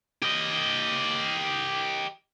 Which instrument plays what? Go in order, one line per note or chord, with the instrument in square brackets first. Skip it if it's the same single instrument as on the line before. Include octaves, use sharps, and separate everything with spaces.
[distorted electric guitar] G4 D#5